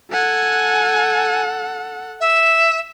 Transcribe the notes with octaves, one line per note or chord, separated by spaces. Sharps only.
A4 F#5 G#5
E5